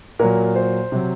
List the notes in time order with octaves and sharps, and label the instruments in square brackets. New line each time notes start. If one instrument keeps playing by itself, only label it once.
[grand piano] A#2 F#3 A#4
C5
C3 F#3